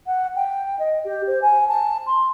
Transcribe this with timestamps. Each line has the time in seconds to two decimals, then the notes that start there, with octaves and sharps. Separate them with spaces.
0.06 F#5
0.36 G5
0.79 D#5
1.04 G4
1.27 C5
1.41 G#5
1.68 A5
2.06 C6